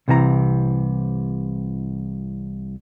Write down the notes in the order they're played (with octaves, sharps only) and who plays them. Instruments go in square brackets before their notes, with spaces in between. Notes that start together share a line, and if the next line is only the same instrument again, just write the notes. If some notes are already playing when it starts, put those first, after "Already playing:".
[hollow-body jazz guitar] C2 C3 E3 A4 A#5